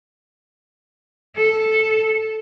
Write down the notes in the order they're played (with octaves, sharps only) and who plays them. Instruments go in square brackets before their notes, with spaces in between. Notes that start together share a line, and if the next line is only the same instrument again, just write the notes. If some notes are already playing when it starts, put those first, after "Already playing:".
[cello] A4